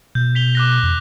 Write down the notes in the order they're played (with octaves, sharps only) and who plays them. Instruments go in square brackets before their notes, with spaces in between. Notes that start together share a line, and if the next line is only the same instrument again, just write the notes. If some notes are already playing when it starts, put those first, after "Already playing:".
[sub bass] B2 [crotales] G6
[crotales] B6 F7 G7
D6 F#6 A#6
[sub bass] F2